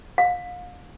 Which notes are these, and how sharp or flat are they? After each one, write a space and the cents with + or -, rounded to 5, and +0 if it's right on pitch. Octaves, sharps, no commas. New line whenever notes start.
F5 +35